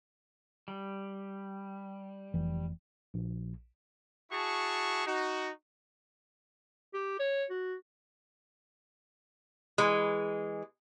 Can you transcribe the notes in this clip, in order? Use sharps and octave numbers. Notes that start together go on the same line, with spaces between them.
G3
F1 E3
A#1
E4 F#4 G#4 A5 C#6
D#4 F#4
G4
C#5
F#4
E3 G#3